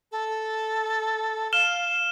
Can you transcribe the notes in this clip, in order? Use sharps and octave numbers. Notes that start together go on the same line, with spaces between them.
A4
F5 F6 E7 G7